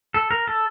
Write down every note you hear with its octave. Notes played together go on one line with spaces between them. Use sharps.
A4
A#4
A4